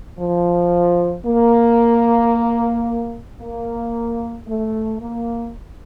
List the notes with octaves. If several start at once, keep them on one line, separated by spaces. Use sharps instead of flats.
F3
A#3
A#3
A3
A#3